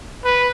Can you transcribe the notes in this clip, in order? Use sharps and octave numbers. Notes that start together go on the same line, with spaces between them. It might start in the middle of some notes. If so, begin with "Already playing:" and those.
B4